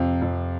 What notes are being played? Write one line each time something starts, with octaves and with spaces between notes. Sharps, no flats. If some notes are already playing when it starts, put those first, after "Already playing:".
Already playing: F2 C3 F5
F2